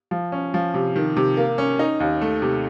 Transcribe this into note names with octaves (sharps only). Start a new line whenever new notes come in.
F3
C#4
F3
C3
D#3
C3
A#3
C#4
D#4
D#2
A3
C3